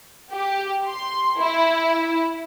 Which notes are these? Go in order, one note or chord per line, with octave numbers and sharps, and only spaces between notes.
G4
C6
E4